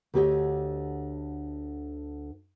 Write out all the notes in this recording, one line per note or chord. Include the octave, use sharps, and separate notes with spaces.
D2 D3 G4 B4 C#5 D#5